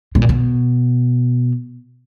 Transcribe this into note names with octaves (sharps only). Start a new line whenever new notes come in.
B2
A#2
B2